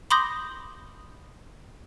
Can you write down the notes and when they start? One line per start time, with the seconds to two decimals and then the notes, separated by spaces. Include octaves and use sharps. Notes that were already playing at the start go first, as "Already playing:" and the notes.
0.11 B5 C6 D6 D#6 G6 A#6